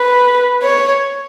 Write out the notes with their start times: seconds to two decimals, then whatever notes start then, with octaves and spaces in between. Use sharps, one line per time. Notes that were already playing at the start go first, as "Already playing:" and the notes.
Already playing: B4
0.63 C#5